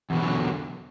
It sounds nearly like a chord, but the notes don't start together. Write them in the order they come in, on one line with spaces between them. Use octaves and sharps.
E2 B2 D#3 D3 F#3